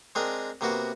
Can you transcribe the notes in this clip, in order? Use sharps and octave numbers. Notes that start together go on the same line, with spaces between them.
G#3 C4 D4 A#4 D#5
C3 A#3 B3 F#4